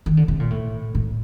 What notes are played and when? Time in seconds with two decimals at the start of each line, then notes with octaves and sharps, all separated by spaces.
0.06 D#3
0.17 D3
0.28 C3
0.40 A#2
0.50 A2
0.95 A2